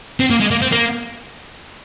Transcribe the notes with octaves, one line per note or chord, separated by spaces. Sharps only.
C4
A#3
G#3
A#3
C4
A#3